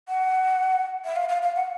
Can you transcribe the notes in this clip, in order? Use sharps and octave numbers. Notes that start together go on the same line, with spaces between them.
F#5
E5
F5
F5
F5
F#5